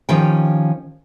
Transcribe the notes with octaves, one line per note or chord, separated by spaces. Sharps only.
D#3 F3 C#4 G4 G5